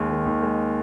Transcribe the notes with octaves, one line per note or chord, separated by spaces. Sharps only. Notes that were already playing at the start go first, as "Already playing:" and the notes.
Already playing: D#2 G#3
D#3
D#2
G#3